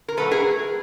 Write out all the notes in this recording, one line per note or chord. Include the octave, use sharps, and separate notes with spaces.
A#4
A#2 F#3 A3 A4 B4
G#4 A#4